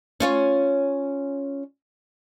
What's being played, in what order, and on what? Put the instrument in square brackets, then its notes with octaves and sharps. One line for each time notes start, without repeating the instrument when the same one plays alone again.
[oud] C#4 F4 C#5